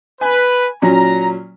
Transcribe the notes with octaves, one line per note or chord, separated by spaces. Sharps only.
B4 G#5
A#2 F#3 C#4 A#5